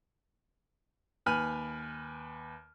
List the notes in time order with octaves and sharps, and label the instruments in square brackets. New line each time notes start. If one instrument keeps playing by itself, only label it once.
[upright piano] D#2 B4 G#5 B5 F6 D#7